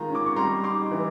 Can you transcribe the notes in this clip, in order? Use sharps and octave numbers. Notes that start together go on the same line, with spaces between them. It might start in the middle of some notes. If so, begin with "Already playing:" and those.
Already playing: D#3 G#3 F4 A#5
C#4 D6
C#6
G3 A#5 C6
D#4 C6 D6
E3